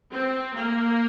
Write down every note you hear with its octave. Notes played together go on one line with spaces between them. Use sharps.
C4
A#3